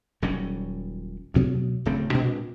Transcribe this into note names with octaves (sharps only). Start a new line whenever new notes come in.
D#1 F#3 G3 C#4
D2 B2 F#3
D1 C#3 A3 C4
A#2 G#3 C4 D4